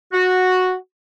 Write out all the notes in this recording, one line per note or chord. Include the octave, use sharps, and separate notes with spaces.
F#4